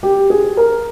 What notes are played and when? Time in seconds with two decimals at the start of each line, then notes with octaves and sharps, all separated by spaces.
0.03 G4
0.30 G#4
0.57 A#4